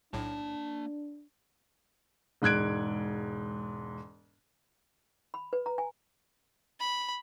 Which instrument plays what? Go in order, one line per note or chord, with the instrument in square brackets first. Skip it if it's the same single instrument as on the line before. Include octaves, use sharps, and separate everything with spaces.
[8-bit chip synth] B1 A2 [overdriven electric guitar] A#3 A5 [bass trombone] D4
[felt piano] E1 G#2 F#6 G#6 D7
[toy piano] B5
B4
A#5
G#5
[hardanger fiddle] B5